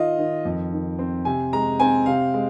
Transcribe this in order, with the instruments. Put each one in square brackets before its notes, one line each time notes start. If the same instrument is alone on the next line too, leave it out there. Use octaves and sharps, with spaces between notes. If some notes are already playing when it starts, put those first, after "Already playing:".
Already playing: [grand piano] D#3 F4 D#5
D#3
F2
D#3
C4
C3 G#5
G#3 A#5
C4 G#5
C3 F5
G#3